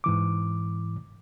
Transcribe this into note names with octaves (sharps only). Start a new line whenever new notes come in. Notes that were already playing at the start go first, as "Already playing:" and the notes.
G#2 E3 D6